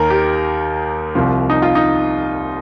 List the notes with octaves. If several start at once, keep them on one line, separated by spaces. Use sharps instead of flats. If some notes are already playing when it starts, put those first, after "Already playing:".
Already playing: D#2 D#3 A#4
G4
C2 C3 F3
D#4
F4
D#4